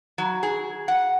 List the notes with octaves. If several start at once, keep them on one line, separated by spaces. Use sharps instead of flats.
F#3
G#4
F#5